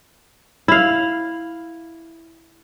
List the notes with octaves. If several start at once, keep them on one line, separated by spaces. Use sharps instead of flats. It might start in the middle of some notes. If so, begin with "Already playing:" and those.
E4 F5